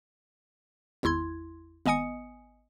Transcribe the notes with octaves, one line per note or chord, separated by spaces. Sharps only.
G#1 E2 E4 C6 G#6
G#1 B3 D#5 G#5 D#6 C#7